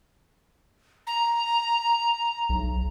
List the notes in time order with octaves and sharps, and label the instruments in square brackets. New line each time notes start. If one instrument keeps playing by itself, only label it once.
[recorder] A#5
[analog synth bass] B1